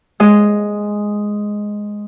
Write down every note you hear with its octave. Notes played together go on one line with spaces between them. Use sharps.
G#3 D#5